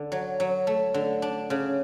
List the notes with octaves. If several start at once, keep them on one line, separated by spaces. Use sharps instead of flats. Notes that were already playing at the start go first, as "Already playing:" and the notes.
Already playing: D3
F#3
F#3
A3
D3
D4
C#3